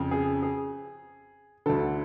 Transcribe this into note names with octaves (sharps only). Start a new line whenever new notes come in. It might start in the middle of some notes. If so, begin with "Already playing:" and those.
Already playing: F2 C#3
G#4
G#4
D2 D3 A4